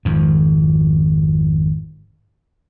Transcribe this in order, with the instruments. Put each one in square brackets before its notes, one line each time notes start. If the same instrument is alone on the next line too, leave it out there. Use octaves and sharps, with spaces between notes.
[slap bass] G#1 F2